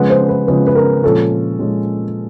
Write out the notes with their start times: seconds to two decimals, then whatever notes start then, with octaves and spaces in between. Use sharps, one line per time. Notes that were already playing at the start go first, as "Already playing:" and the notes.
Already playing: C#3 F3 G#3 B3 F#5
0.10 C5
0.29 B4
0.47 C#3 F3 G#3 B3 B4
0.67 B4
0.75 A#4
1.03 A#2 F3 G#3 C#4 A4
1.59 A#2 F3 G#3 C#4